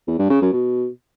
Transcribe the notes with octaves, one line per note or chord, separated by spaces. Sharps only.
E2
G2
C#3
F#2
B2